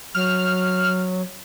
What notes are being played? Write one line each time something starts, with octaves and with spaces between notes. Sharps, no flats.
F#3 F6